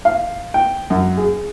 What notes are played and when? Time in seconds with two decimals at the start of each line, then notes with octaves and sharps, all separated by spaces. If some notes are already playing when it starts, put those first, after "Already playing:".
0.05 F5
0.54 G5
0.90 F#2
1.17 G#4